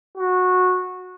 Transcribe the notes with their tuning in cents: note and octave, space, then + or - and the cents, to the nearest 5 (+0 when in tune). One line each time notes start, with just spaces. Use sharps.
F#4 -15